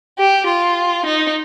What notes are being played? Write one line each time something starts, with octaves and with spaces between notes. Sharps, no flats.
G4
F4
D#4